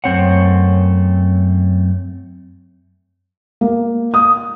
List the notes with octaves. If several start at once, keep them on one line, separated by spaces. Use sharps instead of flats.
F#2 A3 C4 C#5 F#5
A#3
D#6